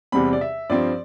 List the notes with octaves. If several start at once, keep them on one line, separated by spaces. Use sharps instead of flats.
E2 C3 G3 C4 B5
D5
E5
G2 F3 C4 D5